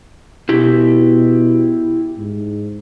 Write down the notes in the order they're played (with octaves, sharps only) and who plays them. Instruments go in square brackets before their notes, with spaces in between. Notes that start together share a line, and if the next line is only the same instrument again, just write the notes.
[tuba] B2 [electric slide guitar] E4 G4
[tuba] G#2